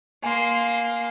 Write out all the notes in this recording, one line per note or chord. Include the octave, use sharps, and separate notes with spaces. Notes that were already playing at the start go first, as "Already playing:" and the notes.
A#3 G#5 C6